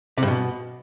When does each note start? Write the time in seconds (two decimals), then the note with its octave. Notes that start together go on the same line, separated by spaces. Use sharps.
0.17 C3
0.23 G2
0.28 B2